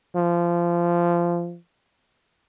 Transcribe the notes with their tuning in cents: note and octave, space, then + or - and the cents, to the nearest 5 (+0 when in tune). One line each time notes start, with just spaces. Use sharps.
F3 -20